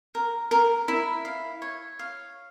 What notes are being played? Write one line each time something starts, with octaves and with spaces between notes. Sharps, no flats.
A#4
A#4
E4
F5
C#5
F5